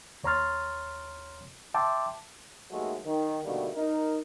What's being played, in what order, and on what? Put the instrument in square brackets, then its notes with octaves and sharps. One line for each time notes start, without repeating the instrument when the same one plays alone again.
[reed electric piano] D#2 C#5 A#5 C6 F6 A6
E5 G5 A5 C6 D6
[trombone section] D#2 F#3 G#3 A3
D#3
B2 D3 D#3 G3 A3 A#3
D#4 A#4